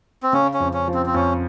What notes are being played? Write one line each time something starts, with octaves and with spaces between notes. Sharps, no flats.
C4
C#3 C#4
C#4
F2
C#4
F3
C4
C4
F2 C#4